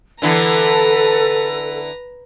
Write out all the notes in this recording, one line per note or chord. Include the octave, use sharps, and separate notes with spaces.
D3 E3 B3 A4 B4 A#5